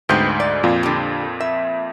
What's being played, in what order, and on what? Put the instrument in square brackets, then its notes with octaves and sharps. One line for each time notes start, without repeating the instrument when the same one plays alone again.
[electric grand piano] D2 G#2 G6 [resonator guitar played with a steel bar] B3 C4
[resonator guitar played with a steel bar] D5
[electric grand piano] F2 A#2 F4
[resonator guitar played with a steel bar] D3 G4
E5